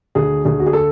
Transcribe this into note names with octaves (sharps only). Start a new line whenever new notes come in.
D2 G#4
D2 G#4
F#4
G#4
A4